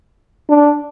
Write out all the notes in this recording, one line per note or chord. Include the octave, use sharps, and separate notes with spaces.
D4